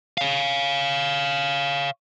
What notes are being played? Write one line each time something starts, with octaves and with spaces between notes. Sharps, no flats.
C#5 F5